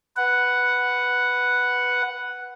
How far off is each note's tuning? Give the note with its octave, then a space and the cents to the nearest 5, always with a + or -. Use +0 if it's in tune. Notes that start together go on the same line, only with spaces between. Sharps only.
B4 +0 F#5 +0